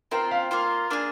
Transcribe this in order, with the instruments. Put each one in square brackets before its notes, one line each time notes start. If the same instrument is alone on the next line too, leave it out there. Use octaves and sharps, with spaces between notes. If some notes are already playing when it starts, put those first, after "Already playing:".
[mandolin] C4 F4 C5 G5 [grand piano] A#4
[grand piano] F5
[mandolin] A#3 F4 C5
A#3 D4 G#4